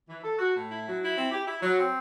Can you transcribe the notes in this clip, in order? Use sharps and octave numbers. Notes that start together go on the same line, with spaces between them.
E3
A4
F#4
A2
E4
F#3
E4
C4
G4
E4
F#3
C4